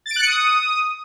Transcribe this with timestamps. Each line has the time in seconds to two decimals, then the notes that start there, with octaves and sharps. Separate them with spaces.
0.06 A6
0.11 D7
0.16 F#6
0.21 C#7
0.26 D#6